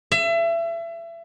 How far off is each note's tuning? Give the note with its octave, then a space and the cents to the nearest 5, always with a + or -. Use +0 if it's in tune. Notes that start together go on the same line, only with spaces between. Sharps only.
E5 +30